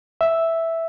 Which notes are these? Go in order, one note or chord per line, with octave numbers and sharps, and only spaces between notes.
E5